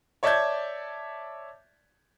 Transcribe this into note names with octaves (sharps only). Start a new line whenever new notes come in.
C#5 D5 E5 A5 G6 G#6